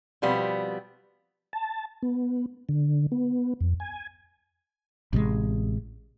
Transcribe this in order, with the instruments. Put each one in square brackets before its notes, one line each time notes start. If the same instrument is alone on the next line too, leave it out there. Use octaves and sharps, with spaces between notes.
[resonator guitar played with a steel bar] B2 F3 G3 B3 C4
[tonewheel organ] A5
B3
D3
B3
F2
G#5
[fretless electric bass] A1 C3 F#3 G#3